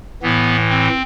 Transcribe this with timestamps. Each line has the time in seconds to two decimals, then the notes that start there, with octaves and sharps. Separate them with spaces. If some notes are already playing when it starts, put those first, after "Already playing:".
0.22 A2 E3 B3
0.69 C4